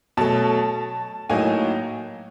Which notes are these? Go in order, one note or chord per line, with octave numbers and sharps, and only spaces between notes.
B2 F#3 A3 A5
A2 F#3 A#3 D#4 G#5